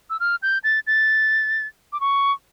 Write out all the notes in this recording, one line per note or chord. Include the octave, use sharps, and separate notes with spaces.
E6
F6
G6
A6
A6
D6
C#6